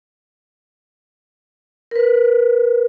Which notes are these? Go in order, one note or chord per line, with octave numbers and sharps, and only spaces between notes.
A#4 B4